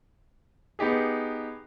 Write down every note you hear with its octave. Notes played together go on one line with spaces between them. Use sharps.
B3 D#4 G4 G#4